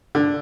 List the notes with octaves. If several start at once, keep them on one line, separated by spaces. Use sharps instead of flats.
D3